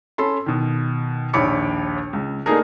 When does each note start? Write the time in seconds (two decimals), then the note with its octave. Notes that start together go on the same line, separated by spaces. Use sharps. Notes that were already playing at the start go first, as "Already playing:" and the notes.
0.18 C#4 A4 B5 C6
0.46 B2 D#3
1.33 A#1 D#2 C#5 B5 D6 C#7
2.13 C#2
2.46 A3 A#3 D4 D#4 G#4 A#4